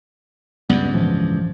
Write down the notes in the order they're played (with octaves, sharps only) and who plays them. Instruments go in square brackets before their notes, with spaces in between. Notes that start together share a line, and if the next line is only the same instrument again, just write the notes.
[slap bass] C#2 G2 [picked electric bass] G3 B3
[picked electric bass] A2 E3 F3